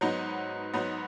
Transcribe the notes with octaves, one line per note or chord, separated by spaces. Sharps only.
G#2 F#3 B3 D#4
G#2 F#3 B3 D#4